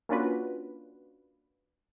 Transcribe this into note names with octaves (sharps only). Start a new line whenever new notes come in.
A#3 C#4 D4 F4 F#4 B4